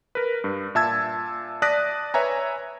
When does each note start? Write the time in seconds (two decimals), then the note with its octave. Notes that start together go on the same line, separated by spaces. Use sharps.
0.15 A#4 B4
0.44 G2
0.75 A#2 E5 A5 E6 G#6
1.62 D5 A5 D#6 F#6 A#6 B6
2.14 B4 C#5 E5 G#5 A#5